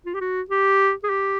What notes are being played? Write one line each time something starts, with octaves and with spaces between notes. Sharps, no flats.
F4
G4
F#4
G4
G#4
G4